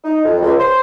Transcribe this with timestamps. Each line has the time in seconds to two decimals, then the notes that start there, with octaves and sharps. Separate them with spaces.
0.04 D#4
0.25 F2
0.42 C#2
0.59 C5